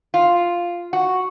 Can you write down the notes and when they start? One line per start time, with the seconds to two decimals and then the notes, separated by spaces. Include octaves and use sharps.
0.14 F4
0.93 F#4